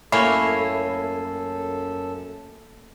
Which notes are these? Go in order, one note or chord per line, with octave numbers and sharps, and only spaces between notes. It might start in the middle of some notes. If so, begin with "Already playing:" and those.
F#2 A3 A#3 E4 A4 C#5 G#5 C7